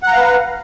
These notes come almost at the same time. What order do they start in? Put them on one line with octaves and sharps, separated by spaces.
F#5 A#5 F5 B4